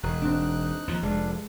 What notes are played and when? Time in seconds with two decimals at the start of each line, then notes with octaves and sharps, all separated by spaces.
0.03 E1 D#4 F#6
0.22 C4 D4
0.88 D#2 F3
1.02 F1 G#3 D4